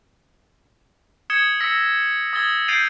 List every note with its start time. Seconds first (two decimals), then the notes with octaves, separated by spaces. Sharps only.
1.30 D#6 G#6 C#7 E7 G7
1.60 E6 A#6 B6 C#7
2.33 D#6 G#6 A6 G7
2.68 G6 A6 C7 D7 D#7 F7